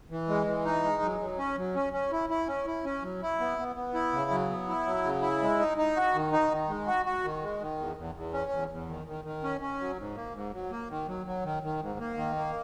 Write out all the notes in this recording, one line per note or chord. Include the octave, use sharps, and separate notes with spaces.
E3
G#3
E3
D#4
G#3
F#3
F#3
C#4
F#3
C#4
C#4
E4
E4
C#4
E4
C#4
F#3
E4
B3
B3
B3
E4
C#3
F#3
B3
E4
F#3
C#3
E4
G#3
D#4
D#4
F#4
D#3
D#4
D#3
G#3
F#4
F#4
D#3
G#3
D#3
E2
E2
E2
C#4
E2
E2
D#3
D#3
D#3
C#4
C#4
F#3
G#2
A#3
G#2
F#3
A#3
D#3
F#3
F#3
D#3
D#3
G#2
A#3
D#3
A#3